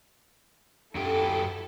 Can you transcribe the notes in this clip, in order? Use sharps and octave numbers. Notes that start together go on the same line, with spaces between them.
F#2 E4 G4 A4